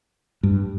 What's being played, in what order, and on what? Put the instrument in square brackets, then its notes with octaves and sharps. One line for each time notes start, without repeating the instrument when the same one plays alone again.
[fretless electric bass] G2